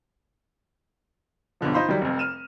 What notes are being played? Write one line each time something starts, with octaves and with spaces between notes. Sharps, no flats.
B1 G2 D3 F3
D#4 F4 C5 F5 B5 C6
D#3 F#3 G3
F1 F2
F6 D#7 E7